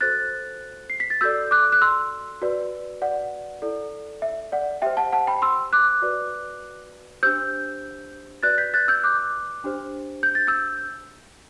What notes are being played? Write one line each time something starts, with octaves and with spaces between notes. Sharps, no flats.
F#4 A4 C5 F#6 A6
C7
B6
A6
F#4 A4 D5 E6 G6
D6 F#6
F#6
C6 E6
F#4 B4 D5
D5 F#5
E4 A4 D5
E5
D5 F#5
G4 C5 E5 G5
F#5 A5
F#5 A5
G5 B5
C6 E6
D6 F#6
F#4 B4 D5
D4 G4 C5 E6 G6
F#4 B4 D5 F#6 A6
G6 B6
F#6 A6
E6 G6
D6 F#6
D4 G4 C5
G6
A6
E6 G6